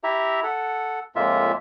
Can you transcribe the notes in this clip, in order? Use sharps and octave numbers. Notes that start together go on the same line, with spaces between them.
E4 G4 E5 A#5
A4 F#5
F2 A2 G#3 A#3 F4 E5